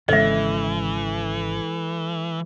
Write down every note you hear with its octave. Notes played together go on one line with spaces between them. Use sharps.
G#1 C#3 E3 G#3 A4 D#5 E5